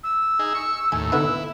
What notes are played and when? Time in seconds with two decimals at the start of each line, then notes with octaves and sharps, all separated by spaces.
0.04 E6
0.39 D#4 G#4
0.55 C#6
0.92 D#2 A2 G#5
1.12 D3 B3 D#4 E4